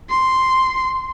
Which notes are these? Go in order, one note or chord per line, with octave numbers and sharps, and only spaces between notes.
C6